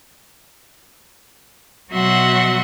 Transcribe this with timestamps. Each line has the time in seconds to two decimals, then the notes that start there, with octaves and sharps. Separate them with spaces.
1.92 B2 F#3 F#4 E5 F#5 C6